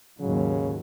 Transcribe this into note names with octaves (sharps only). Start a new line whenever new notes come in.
D#2 G#2 C#3 F#3